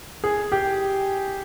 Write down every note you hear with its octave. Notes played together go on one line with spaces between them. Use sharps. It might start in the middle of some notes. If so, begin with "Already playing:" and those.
G#4
G4